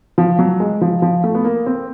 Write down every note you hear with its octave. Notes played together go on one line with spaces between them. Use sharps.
F3
F#3
G#3
F3
F3
A3
B3
A#3
C4